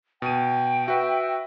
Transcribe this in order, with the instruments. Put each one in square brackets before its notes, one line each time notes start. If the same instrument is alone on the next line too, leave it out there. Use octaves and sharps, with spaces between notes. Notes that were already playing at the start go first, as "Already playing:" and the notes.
[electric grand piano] B2 D#7 [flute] G5
[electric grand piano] F#4 B4 [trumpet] E5